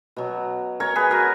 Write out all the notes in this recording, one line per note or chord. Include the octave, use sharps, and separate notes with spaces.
B2 F#3
A#4 C#5
G#4 B4
F#4 A#4